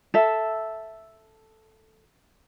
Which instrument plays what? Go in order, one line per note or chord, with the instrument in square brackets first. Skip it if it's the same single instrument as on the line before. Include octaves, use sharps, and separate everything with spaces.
[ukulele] A4 E5